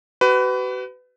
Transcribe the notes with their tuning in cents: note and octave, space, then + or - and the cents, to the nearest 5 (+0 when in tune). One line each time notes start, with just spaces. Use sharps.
F#4 +40 B4 +20